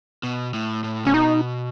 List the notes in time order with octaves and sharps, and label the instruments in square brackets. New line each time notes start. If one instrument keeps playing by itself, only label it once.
[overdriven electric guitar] B2
A2
A2
[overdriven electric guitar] C#3 [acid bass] C#4
[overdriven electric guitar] B2 [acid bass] D#4